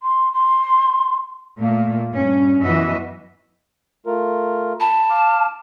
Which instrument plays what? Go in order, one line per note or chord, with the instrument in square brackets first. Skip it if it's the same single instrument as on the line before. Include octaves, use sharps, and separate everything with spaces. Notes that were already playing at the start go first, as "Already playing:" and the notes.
[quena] C6
C6
[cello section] A#2 A3 A#3
G2 C#4
F#2 B2 E3 F#4 D#5 E5
[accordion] A3 F4 A#4
[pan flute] A5 [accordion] B5
[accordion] F5 D6 F6